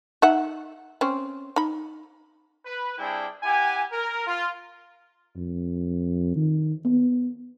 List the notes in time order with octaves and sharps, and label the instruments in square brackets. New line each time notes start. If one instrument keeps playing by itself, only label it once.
[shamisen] D#4 E5 F#5
C4 C#4
D#4 B5
[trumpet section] B4
G3 C4 D4 E4 G#4 G5
E4 G4 F#5 G#5
A#4
F4
[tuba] F2
D#3
B3